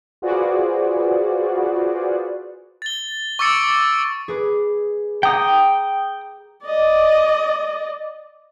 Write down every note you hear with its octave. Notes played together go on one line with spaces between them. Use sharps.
F4 F#4 G#4 B4 C5 D5
A6 G7
C#6 D6 E6 A6 C#7 D7
G#4 B4 D6
G5 A#5 D6 D#6 C#7
D5 D#5